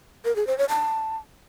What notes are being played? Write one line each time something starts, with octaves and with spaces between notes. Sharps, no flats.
A#4
G#4
C5
C#5
A5